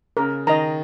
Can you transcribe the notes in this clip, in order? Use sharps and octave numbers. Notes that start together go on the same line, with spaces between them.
C#3 A#4
D#3 D#5 A#5